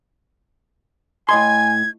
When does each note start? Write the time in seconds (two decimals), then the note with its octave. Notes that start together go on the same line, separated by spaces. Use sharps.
1.29 A2 D#5 G#5 C6 G#6